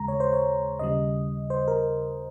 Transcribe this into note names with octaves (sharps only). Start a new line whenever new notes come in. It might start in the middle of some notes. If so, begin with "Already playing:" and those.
Already playing: D#2 C#3 G#3 A#5
C#5
C5
C#5
D#2 C#3 G3 D#5
C5
A#4